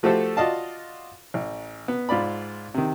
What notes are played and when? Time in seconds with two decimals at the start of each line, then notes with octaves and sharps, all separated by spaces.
0.03 F3 A3 F#4 G4 A4 C5
0.37 F4 F#4 D5 D#5 F5 A5
1.34 A1
1.88 B3
2.09 G#2 F4 D5 B5
2.74 C3 D#3